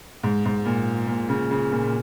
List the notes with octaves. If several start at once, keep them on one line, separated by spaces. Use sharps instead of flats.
G#2
G#2
A#2
A#2
C#3
C#3
A#2
A#2